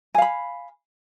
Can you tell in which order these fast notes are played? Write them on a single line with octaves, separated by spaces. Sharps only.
G#5 F5 B5